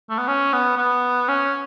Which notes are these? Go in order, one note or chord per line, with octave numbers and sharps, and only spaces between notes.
A3
B3
C#4
B3
B3
C#4